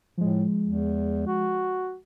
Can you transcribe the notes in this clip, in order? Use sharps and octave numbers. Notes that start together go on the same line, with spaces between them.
A2 F3 G#3
E2
F#4